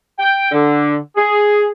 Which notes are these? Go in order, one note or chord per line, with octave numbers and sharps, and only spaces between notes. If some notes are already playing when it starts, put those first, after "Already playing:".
G5
D3
G#4